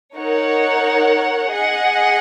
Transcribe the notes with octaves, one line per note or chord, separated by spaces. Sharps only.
D#4 A#4 C#5 F#5
G#4 D#5 F#5